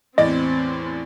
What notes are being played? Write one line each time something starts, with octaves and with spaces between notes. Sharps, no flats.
E2 A2 C4 D5 D#5